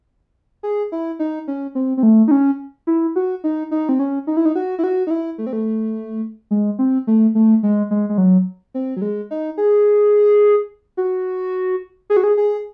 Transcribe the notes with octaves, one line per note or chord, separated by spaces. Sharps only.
G#4
E4
D#4
C#4
C4
C4
A3
D#4
C#4
E4
F#4
D#4
D#4
C4
C#4
D#4
E4
D#4
F#4
E4
F#4
D#4
E4
A3
C4
A3
G#3
C4
A3
A3
G#3
G#3
G#3
F#3
C4
F#3
G#3
D#4
G#4
F#4
G#4
F#4
G#4
G#4